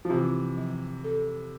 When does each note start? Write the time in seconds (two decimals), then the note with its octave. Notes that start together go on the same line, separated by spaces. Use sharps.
0.05 F3
0.09 C3 E3 F4
0.57 F3
1.04 A4